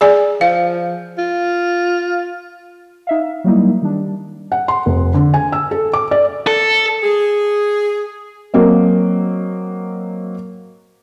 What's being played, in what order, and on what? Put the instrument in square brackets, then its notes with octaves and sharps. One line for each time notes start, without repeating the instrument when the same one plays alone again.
[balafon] G#4 D5 G#5
[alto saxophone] F3 [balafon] F5
[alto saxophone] F4
[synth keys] D#4 E5 F5
F#3 G3 A#3 D#4 E4
D#3 G3 D4
[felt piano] F#5
C6
F1
D3
G#5
E6
A4
D6
D5
[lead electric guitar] A4
[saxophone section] G#4
[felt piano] F#3 A#3 C4 D#5